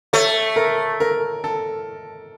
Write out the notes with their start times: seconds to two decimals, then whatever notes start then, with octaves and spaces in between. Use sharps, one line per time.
0.13 A3 C#5
0.56 A#4
1.00 A#4
1.44 A4